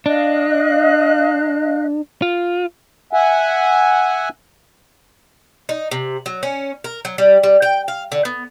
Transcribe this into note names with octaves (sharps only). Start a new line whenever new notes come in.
D4 D#5 F5 F#6
F4
E5 F#5 G#5
D#4
C3
F#3
C#4
A#4
F#3
G3
G3
G5
F5
D3
B3